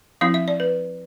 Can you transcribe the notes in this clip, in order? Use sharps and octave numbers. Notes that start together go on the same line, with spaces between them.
F3 C4 E4 F5
E5
D5
B4